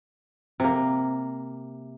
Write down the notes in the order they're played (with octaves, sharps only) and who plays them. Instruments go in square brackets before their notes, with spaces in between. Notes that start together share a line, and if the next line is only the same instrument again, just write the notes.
[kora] C3 A#3